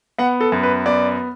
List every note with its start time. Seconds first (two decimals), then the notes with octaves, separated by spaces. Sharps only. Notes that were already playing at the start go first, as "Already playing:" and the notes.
0.19 B3 F#5
0.41 A4
0.52 F#2
0.63 B4
0.86 B3 D5